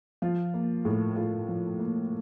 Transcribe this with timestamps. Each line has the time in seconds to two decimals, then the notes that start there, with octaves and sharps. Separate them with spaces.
0.22 F3 F4
0.54 A#3
0.85 A2
1.16 A2 F4
1.48 F3
1.79 A#3